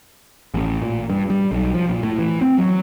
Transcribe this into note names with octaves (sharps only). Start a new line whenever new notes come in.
A1
A#2
G2
G3
B1
F3
A#2
A2
E3
C4
F#3